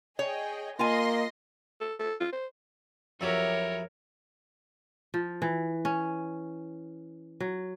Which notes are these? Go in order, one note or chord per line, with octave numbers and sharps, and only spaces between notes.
G#4 C#5 D#5 G5
A#3 F4 D#5 G#5 C6 A#6
A4
A4
F4
C5
F2 F#3 E4 F#4 G4 A#4 C#5
F3
E3
C#4
F#3